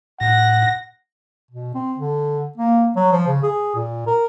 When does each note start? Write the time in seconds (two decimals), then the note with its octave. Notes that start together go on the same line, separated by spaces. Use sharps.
0.21 A2 F#5 A#6
1.51 B2
1.74 C4
1.98 D3
2.57 A#3
2.96 F#3
3.12 F3
3.27 C#3
3.43 G#4
3.75 A#2
4.07 A#4